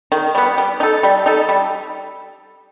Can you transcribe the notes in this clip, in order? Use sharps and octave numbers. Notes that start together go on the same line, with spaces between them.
D#3
G3 B3
G3
D#4 A4
G3
D#4 A4
G3